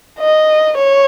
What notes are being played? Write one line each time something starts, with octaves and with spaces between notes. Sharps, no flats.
D#5
C#5